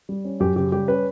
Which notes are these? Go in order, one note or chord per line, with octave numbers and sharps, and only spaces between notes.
G3
C#4
F#2 G4
C#3 G4
G3 G4
C#4 B4